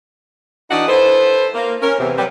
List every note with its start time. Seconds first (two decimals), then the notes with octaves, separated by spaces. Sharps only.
0.71 E3 D4 D#4 F#4 D#5 F#5
0.89 E4 A4 B4 C5
1.55 A#3
1.82 C#4 A#4
2.00 E2 C3 E3
2.17 F#3 G3 C4 G4 B4